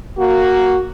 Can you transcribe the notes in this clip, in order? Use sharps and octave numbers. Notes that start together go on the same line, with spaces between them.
A#3 F#4